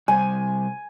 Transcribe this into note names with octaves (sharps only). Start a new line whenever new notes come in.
C3 G3 G#5